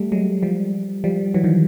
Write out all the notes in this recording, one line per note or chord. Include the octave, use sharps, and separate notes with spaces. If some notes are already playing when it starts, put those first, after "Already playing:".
Already playing: G3 A3
F#3 G#3
F3 G3
F3 G3
E3 F#3
D#3 F3